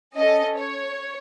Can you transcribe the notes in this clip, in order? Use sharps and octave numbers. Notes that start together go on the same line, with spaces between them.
C#4 A4 D#5
C#5